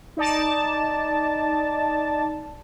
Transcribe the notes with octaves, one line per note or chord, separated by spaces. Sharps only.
D#4 D5 A5